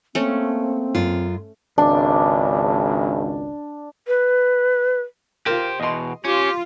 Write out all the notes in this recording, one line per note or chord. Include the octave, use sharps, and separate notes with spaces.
A3 A#3 C4 C#4
F#2 F4
G#1 C#2 D4
B4
F4 G4 A#4 C5
E2 B2 D#5 C6
C#4 F4 G4